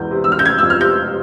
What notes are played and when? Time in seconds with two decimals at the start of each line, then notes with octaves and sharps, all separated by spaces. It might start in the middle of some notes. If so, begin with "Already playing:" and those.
Already playing: E1 E2 G6
0.11 C3
0.24 E6
0.28 E1 F6
0.39 G6
0.46 F1 G#6
0.58 F2 E6
0.70 F6
0.81 C3 G6